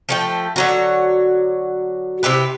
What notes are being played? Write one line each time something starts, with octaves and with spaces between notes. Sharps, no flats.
F3 A3 G5
D3 F#3 F#4
C3 E4 G4 B4